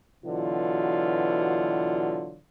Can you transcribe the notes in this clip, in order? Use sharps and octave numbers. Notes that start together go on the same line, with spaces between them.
B2 D3 E3 F#3 F4